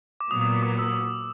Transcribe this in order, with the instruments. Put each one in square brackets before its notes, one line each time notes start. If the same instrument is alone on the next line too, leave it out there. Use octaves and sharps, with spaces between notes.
[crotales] D6
[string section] A#2 F#3 B3 [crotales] D#6
[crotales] D#6
D#6
D6
E6